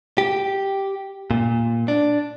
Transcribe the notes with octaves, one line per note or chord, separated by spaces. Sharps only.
G4
A#2
D4